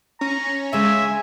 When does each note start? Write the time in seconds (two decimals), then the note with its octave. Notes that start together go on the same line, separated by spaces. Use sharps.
0.21 C#4 A#5
0.73 C#3 G#3 E5 G#5